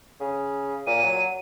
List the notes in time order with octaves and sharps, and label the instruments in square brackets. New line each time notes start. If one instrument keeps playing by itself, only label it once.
[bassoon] C#3
[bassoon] A#2 [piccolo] D#7
[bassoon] F#3